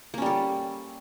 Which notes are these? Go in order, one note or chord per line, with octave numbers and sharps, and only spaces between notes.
G3 A#3 C#4 A4